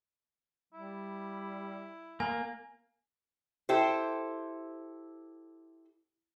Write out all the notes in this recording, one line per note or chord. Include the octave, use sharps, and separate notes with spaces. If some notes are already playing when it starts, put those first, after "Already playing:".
G3 E4
A#3 G#5
E4 G4 A4 C5